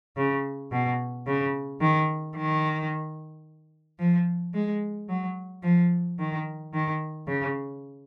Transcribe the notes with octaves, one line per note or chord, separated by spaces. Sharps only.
C#3
B2
C#3
D#3
D#3
F3
G#3
F#3
F3
D#3
D#3
C#3